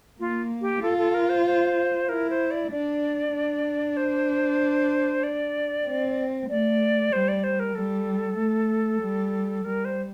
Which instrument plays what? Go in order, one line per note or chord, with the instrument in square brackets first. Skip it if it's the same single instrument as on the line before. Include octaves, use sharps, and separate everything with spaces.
[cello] A#3 [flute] F4
[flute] G4
[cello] F4 [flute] A4
[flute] A4
A#4
C5
C5
[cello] E4 [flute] A#4
[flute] C5
D5
[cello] D4 [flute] D5
[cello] D4
[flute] C5
D5
[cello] C4
[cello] A3 [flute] D5
[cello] G3 [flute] C5
[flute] D5
C5
A#4
[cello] G3 [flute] A4
[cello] A3
G3
[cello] G3 [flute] A#4
[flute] C5